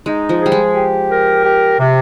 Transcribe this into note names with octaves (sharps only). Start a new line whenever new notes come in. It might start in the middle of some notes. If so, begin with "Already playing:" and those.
G#3 D#4
F3
G3 G#4
G#3
G4
A#4
G4
C3